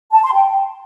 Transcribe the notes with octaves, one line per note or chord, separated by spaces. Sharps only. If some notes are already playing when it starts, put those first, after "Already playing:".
A5
C6
G5